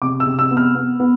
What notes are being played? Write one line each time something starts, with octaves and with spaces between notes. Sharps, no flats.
C3 D6
E6
C3
E6
B3
F6
B3
B3